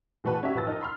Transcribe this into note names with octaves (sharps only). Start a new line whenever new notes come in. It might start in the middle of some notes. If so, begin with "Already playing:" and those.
A#1 E3 A3 F#4 B4
C#4 F#4 G4 E5
A1 F3 B4 E6 A6
F3 D#4 A#4
B5 C6 F6